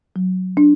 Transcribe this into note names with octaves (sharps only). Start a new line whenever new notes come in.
F#3
D4